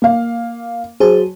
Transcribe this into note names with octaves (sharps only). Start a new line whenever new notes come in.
A#3 F5
F#3 G#4 C5 A5